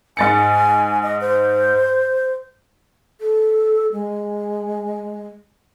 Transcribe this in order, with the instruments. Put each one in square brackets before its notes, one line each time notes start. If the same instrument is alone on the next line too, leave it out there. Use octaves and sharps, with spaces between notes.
[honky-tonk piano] G#2 A6 C#7 [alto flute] G#5
[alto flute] D#5
C5
[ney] A4
G#3